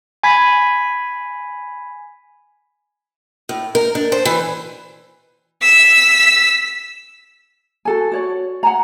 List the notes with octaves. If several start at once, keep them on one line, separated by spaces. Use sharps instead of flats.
G#5 B5 G#6 B6
A2
A#4
D4
C5
E3
E6 B6
F#4 A4 G#5
F#4 C#5 D5
F#5 G#5 A#5